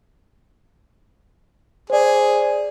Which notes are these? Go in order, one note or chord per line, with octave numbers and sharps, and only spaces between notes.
G#4 C5 D5